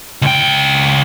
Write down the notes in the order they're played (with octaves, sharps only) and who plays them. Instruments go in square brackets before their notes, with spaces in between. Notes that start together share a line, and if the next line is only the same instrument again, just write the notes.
[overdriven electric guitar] C#2 G5